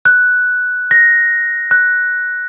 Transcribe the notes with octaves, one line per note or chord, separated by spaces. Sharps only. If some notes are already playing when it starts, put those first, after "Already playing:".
F#6
A#6
F#6